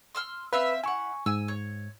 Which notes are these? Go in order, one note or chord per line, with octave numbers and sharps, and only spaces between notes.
C6 E6 F6
C4 B4 E5 F5
E4 F#5 G#5 C#6
G#2 G#5 E6
C#5